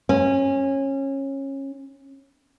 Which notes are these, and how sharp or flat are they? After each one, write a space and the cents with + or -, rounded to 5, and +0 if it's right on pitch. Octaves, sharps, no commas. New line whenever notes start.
C#4 -25